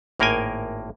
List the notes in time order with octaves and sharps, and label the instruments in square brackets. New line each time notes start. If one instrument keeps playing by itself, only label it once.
[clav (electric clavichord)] G#1 A2 A#3 A#4 G5 G#5